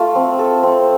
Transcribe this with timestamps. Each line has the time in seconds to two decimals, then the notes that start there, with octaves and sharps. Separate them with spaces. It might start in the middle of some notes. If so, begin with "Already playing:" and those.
Already playing: A3 F4 A4
0.15 C4
0.39 A4
0.63 C4